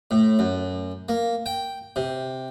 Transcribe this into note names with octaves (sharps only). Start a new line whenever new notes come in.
A2
F#2
A#3
G5
C3